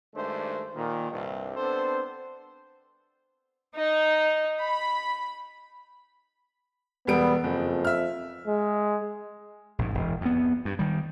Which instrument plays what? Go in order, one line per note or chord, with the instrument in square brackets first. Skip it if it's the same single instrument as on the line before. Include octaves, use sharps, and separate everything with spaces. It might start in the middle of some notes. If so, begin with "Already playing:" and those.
[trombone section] G2 D#3 G#3 A3 D4 C5
A#2 D#3
C2 G2
B3 C4 D4 A4 C5
[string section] D#4
B5
[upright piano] E1 G3 D7 [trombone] B3
[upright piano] F#1 [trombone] F2
[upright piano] E5 F6
[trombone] G#3
[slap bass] A#1 G#2
E1
F2 B3
G2
D#3 G3